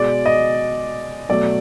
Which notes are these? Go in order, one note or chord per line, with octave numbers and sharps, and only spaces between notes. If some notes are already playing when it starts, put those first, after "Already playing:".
Already playing: B2 G#3 D5
D#5
B2 F#3 A3 D5